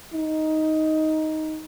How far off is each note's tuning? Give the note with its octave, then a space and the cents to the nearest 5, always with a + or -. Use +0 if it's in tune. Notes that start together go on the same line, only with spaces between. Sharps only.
D#4 +5